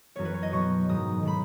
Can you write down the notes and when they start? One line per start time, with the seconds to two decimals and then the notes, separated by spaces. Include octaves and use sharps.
0.16 F#2 E3 B3 C#5
0.25 B4
0.34 C#5
0.43 D#5
0.52 B2 F#3 B3 C#6
0.89 G#2 D#3 F#3 D#6
1.23 D#3 G#3 B5